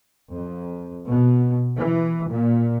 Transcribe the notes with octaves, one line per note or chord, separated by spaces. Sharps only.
F2
B2
E3
A#2